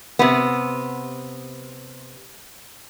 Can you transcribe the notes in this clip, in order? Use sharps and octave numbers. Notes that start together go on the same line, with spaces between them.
C3 B3